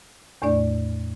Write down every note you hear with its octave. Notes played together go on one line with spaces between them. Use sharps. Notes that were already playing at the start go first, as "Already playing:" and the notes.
E2 A2 A3 D4 D5